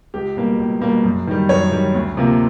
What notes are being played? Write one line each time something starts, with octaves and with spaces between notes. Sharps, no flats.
C#2 G4
B2 G3 A#3
C#2
B2 G3 A#3
F#2
D#3 G3
F#2 C#5
D#3 G3
D2
C3 F3 A#3